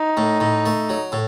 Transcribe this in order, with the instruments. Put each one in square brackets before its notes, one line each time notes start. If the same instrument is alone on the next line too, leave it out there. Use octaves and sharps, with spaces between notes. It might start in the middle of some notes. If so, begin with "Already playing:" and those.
Already playing: [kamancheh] D#4
[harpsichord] A2
A2
A3
F#3
A2